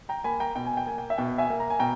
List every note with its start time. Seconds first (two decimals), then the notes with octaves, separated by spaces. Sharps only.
0.09 G5 A#5
0.24 A#3 G#5 B5
0.40 G5 A#5
0.56 B2 G5
0.66 G#5
0.77 G5
0.86 A#3 G#5
0.98 G5
1.10 E5
1.18 B2 G5
1.38 E5 G#5
1.50 A#3
1.60 A#5
1.70 G#5
1.79 B2 G5 A#5